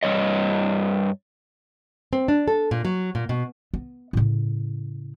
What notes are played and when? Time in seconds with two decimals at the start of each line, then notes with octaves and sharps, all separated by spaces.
0.03 G2 D#3 C#5 D#5
2.13 C4
2.28 D4
2.48 A4
2.71 A#2
2.85 F#3
3.15 A#2
3.29 B2
3.74 B3
4.13 A2 C#3